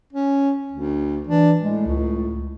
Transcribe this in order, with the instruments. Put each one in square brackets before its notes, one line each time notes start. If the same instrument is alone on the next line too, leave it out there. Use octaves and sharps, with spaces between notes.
[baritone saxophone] C#4
D2
[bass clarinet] E3 [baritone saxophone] D4
[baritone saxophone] A2 [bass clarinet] G#3
[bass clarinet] C#2